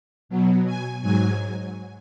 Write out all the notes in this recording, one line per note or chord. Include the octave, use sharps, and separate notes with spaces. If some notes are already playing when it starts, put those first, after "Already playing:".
B2 F#3
G#5
G#2 F#3 G#5